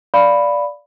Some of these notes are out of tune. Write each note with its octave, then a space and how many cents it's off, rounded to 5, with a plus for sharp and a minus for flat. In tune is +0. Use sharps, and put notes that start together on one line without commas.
D5 -5 F5 +0 B5 +0